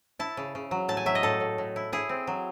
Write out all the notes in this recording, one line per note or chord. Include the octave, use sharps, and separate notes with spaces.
E4 A5
C#3
C#3
F#3
A2 A5
G#5
F#3 E5
D#5
A2 A4
A2
A2
E4
E4 G#4
C4
F#3